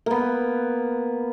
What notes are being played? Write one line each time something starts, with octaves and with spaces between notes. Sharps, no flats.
A#3 B3